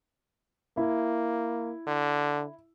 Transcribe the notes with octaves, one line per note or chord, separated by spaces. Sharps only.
A#3 E4
D3